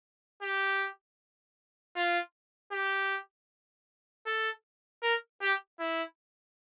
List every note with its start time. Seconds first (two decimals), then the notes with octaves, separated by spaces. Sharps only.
0.42 G4
1.95 F4
2.72 G4
4.26 A4
5.03 A#4
5.42 G4
5.79 E4